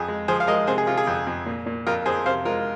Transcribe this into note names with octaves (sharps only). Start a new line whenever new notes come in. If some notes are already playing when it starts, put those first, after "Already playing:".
Already playing: F2 G#4
G#3
F3 G#4 C5
F5
G#3 A#4 D#5
C3 G#4 C5
G#4
C3 F4
G#4
F2
F2
A#2
A#2
F2 F4 A#4
F2 G#4 C5
C3 C5 F5
G#3 F4 A#4